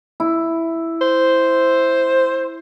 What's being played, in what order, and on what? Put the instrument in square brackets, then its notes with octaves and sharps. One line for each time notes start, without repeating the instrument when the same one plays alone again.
[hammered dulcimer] E4
[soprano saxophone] C5